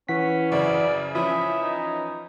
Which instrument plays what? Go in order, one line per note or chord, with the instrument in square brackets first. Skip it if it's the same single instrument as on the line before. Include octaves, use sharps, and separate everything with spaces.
[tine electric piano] E3 F#5 B6 [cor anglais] C#4
[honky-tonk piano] F#2 C#3 C4 [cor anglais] D5
[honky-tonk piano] E3 F3 C#4 [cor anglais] E5 [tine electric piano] B5 D#6 B6
[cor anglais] D#4